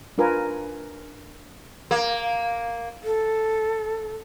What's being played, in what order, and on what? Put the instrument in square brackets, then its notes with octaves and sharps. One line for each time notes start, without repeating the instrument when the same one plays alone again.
[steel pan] D4 F4 A#4 B4 G#5
[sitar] A#3
[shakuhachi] A4